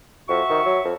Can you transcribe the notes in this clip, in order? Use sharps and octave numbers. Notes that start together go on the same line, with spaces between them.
F2 F#4 E5 C#6
D#3
F#3
F2